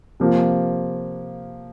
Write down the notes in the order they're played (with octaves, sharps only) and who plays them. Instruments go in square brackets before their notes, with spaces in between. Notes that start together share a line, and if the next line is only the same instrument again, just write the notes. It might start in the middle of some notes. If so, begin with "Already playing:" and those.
[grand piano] C3 F3 A#3